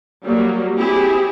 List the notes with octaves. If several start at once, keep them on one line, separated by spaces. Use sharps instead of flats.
F#3 G3 A#3
C4 E4 G4 G#4